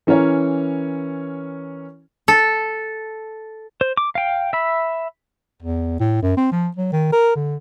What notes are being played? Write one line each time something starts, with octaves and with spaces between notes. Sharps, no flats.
E3 C#4 A#4 C#5
A4
C5
D6
F5 G5
E5 B5
E2
A2
F#2
C4
F3
F#3
D#3
A#4
D3